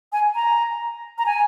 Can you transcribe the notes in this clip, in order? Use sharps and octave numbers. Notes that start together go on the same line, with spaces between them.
G#5
A#5
A#5
G#5